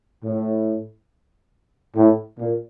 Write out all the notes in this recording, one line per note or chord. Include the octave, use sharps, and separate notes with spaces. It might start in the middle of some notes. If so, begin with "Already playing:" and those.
A2
A2
A#2